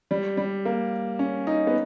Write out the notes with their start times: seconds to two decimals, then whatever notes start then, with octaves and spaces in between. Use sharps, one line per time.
0.11 G3
0.37 G3
0.65 A#3
1.19 C#4
1.47 D#4
1.67 B3